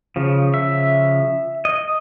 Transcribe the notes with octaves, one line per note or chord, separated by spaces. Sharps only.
C#3 F3
E5
D#5